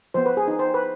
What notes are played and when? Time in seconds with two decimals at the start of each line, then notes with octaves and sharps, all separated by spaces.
0.14 F3 B3 C5
0.26 B4
0.37 G#4
0.48 D#4
0.59 C5
0.74 B4